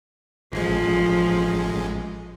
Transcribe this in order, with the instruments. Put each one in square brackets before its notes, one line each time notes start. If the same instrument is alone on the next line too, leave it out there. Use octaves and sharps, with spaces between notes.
[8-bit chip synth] A1 G#3 [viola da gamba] F3